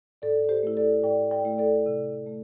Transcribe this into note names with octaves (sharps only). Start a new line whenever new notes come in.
A2 A4 D5
A4
G4 C5
A3 E4
A4 D5
A2 D5 G5
D5 G5
A3 E4
A4 D5
C3
A3